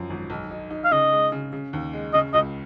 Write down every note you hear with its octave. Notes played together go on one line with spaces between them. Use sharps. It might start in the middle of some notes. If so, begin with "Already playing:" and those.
Already playing: F#2 F3 F#3
G#1
B1
D#4
D#4
F5
C#3 D#5
G#3
C#3
C#3
D#2
G#3
C#3 D#5
C#2 D#5